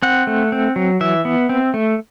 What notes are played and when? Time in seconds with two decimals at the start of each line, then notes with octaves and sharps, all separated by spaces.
0.03 C4 F#5
0.27 A3
0.52 C4
0.76 F#3
1.01 E3 E5
1.25 B3
1.49 C4
1.74 A3